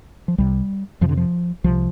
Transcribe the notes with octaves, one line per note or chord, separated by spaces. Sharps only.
F3
C2 C3 G3
F2 C3 F3
D3
F3
C2 C3 F3